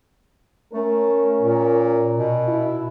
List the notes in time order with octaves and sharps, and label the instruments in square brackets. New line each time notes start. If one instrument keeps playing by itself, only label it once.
[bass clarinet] A3 [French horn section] C#4 A#4
[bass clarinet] A#2
B2
[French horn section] E4